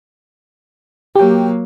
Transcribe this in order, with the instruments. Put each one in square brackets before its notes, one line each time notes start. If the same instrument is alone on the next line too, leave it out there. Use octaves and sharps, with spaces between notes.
[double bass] F#3 A#3 [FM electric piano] G4 G5